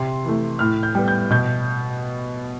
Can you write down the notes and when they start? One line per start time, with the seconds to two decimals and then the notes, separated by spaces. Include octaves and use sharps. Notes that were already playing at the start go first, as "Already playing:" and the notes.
Already playing: C3 C6
0.25 E3 A3
0.59 A2 F6
0.83 G6
0.95 G3 B3
1.08 G6
1.30 B2 G6